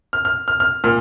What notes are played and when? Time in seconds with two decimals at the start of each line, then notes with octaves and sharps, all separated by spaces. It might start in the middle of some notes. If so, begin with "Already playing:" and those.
0.13 F6
0.25 F6
0.48 F6
0.60 F6
0.84 A#2 F6